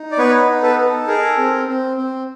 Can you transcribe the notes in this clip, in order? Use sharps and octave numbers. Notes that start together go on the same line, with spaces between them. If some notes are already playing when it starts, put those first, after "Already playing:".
Already playing: D#4
D5
B3 B4 C#5
D#4
A4 B4
A4
G#4 A#4
C4
C4
C4